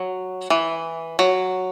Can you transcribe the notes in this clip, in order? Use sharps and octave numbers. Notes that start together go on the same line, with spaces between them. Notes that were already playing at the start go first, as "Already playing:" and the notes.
Already playing: F#3
E3
F#3